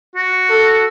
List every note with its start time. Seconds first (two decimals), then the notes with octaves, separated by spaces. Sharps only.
0.16 F#4
0.50 A4